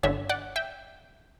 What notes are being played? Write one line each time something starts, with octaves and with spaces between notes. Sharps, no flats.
G1 G2 D3 C#5 E5
D5 F#5
E5 G5